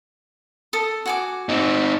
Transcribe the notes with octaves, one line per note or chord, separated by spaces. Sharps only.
A4 D#6
F#4 G#5 D6
C4 D#4